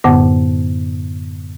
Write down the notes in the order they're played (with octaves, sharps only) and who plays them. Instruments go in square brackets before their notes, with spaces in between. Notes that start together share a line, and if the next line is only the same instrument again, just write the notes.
[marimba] F#2 A2 D3 B3